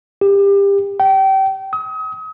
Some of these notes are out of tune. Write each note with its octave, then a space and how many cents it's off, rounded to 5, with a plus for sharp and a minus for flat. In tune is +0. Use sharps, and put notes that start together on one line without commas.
G4 +25
G5 -30
D#6 +35